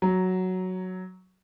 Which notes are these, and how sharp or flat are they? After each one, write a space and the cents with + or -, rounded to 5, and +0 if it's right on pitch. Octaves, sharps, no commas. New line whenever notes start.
F#3 +0 A#5 +0